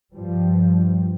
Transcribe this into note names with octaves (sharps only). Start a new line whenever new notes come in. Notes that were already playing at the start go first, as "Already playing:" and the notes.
G2 F3 G3